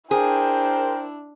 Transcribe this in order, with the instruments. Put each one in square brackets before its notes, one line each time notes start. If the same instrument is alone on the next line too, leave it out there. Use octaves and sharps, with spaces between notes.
[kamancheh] D4 E4 [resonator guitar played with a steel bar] G#4 [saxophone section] A#4 C5 [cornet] G5